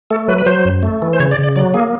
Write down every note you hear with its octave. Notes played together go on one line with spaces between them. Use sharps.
A3 A4
F#3 B4
B4
F#3 C5
F#2
A3
E3
C5
C#3 C#5
D5
C#3
D5
F#3 D5
A#3 G#4